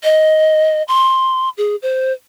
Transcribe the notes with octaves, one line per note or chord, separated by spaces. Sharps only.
D#5
C6
G#4
C5